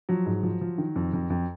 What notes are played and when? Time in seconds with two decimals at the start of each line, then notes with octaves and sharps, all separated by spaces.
0.09 F3 F#3
0.26 G#2
0.43 F3
0.61 F3
0.78 D#3
0.96 F2
1.13 F2
1.30 F2